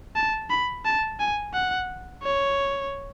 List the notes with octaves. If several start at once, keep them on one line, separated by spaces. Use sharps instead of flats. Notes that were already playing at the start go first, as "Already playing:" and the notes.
A5
B5
A5
G#5
F#5
C#5